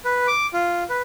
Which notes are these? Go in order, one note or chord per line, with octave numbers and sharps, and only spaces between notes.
B4
D6
F4
B4